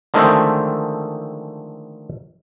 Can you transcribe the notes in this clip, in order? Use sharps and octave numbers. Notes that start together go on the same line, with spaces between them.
D3 D#3 F3 G#3 A3 C4